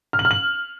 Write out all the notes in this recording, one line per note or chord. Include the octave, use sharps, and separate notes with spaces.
F6
F#7
F6
F#7